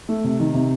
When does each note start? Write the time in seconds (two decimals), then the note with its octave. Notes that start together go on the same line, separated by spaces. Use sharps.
0.09 A3
0.24 C3
0.40 D#3
0.54 C3